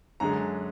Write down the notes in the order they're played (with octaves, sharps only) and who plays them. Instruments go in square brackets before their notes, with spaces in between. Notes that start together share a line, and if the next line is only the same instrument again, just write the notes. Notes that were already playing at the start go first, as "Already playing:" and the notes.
[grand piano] F#2 D3 G#3 A#5